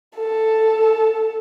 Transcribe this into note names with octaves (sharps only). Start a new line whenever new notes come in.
A4